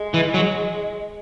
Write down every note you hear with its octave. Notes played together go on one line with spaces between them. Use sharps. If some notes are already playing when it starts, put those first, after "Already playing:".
Already playing: G#3
E3
F#3